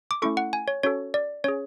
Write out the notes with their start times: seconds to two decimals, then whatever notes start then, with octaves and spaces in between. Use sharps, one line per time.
0.11 D6
0.22 A3 C#4 E4 A4 C#6
0.37 F#5
0.53 G#5
0.68 C#5
0.83 C#4 F#4 A4 C#5
1.14 D5
1.44 C#4 G#4 C#5